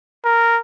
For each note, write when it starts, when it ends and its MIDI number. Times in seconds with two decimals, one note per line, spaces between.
0.25 0.58 70